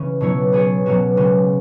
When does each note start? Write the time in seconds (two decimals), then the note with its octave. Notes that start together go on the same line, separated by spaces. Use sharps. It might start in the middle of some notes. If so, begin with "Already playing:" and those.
Already playing: C#3 E3 C#4
0.21 B2 F#3 E4 C#5
0.52 B3 G#4 C#5
0.86 B2 F#3 C#4 F#4
1.17 C#3 G#3 C#4 F#4